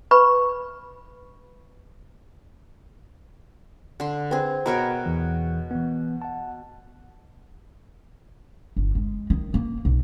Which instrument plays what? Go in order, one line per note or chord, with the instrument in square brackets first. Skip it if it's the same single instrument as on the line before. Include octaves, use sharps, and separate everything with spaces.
[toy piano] B4 B5 C#6
[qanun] D3 C6
[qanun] C4 G#4 [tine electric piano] B4 C5
[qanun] B2 A#4 C#5 [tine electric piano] A#5 B5 F6
[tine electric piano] E2 E3 G#4
E3 B3
F#5 A5
[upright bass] G1
G#3
D#3
A#3
B1